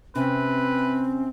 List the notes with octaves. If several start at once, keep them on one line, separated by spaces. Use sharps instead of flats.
C3 C4 C#4 B4